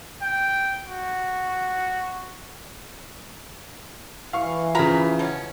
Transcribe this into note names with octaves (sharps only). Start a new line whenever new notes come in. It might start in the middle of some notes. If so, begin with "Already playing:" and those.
G5
F#4
E3 F5 C#6
C#3 F3 A#4 A#5 B5
B2 C#4